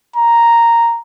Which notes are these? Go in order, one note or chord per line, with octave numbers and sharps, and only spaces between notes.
A#5